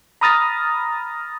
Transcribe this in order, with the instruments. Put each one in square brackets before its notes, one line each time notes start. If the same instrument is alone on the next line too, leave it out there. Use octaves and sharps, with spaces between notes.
[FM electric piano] A#5 B5 D#6 F6 A6 A#6